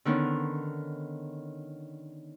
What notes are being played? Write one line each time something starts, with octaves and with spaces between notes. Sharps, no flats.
D3 D#3 B3 C#4